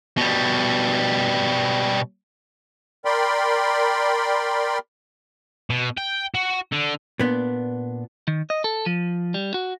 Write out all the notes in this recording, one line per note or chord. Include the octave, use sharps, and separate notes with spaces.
B2 G3
A#4 D5 G5 B5 C6
B2
G5
F#4
D3
A#2 B3 D4
D#3
D#5
A4
F3
G3
F#4